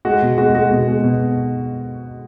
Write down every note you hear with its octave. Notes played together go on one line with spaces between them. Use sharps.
G#3 F#4
B2
G#3 F#4
G#3 F#4
B2
G#3
B2